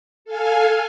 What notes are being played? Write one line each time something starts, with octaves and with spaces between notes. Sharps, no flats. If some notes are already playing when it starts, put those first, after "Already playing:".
A4 F5 G#5 F6